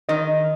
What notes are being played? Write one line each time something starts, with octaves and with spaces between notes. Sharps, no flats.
D#3 D#5